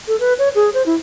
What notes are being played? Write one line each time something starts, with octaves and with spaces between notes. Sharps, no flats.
A4
B4
C#5
G#4
C5
E4